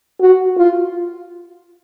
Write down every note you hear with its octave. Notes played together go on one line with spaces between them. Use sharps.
F#4
F4